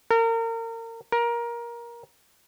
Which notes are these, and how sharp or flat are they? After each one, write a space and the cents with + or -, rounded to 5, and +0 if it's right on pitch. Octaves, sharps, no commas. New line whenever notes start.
A#4 -30
A#4 +20